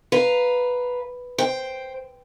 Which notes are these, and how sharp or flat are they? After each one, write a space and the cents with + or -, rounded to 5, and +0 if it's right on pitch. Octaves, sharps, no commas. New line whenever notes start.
B4 +0 F5 +0 A#5 +0
C5 +0 G5 +0